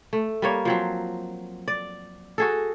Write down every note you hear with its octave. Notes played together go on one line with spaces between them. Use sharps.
A3
G3 A#3 C#5
F3 F#3 C4
D5
F#4 G#4 A4